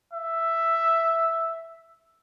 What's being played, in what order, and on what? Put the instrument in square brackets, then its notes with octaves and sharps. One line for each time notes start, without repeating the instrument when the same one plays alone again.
[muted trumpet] E5